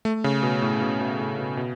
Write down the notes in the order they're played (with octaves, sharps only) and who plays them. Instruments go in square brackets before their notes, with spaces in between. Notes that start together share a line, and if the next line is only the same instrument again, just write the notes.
[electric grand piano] A3
C#3
B2
A2
B2
B2
A2
B2
B2